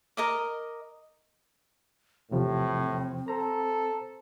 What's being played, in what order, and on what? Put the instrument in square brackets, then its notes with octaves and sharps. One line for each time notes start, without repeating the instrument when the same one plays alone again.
[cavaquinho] A#4 D#5 D6
[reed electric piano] E2 C3 F3 [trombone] A2 [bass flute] C4
[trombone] A4 [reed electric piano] C5 A#5